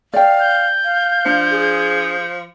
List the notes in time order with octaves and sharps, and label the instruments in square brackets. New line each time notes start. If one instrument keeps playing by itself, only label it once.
[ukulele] D5 G5 [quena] F5
[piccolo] G6
[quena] F5
[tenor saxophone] F3 [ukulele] D4
[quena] G#4